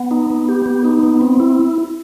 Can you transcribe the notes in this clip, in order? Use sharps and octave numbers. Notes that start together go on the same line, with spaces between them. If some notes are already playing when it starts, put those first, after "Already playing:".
Already playing: B3
D#4
B3
G4
B3
D#4
B3
C4
E4